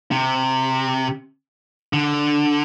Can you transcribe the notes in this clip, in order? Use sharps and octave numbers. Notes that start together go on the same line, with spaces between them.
C3
D3